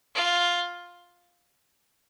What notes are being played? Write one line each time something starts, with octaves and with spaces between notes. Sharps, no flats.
F4